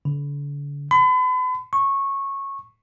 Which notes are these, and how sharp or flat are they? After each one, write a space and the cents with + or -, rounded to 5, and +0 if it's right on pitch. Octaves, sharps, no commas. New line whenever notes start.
D3 -40
B5 +40
C#6 -15